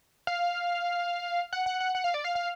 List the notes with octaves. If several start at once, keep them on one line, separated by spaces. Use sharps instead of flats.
F5
F#5
F#5
F#5
F#5
F5
D5
F5
F5